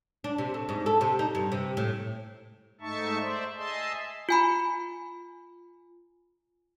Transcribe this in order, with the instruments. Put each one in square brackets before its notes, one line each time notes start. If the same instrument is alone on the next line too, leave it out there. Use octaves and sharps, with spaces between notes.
[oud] D4
C3
A3
G#2
A4
C3
D#4
G2
C3
A2
[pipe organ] G#2 A3 D#4 E5 A5 C#6
C5 D5 E5
G#4 D#5 E5 A5 C6
[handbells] F4 G#5 B5